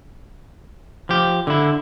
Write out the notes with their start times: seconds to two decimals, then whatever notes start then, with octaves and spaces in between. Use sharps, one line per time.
1.09 F3 G4
1.47 D3 E4